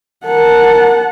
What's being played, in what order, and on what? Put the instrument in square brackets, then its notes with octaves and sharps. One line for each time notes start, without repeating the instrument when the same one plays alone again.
[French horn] A#4 [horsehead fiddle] F#5 A5